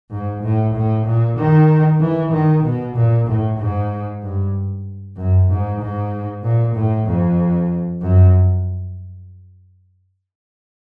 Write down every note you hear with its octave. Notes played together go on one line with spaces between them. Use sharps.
G#2
A2
A2
A#2
D#3
E3
D#3
B2
A#2
A2
G#2
G2
F#2
G#2
G#2
A#2
A2
F2
F#2